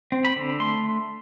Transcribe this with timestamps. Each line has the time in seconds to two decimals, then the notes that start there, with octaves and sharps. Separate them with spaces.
0.12 C4
0.25 B5
0.36 D3
0.60 A3 C6